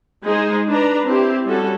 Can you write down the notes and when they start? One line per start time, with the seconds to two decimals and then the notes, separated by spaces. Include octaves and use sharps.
0.24 G#3 D#4 G#4 C5
0.69 D4 B4 A#5
1.06 C4 E4 G4
1.46 G3 C#4 F#4 A4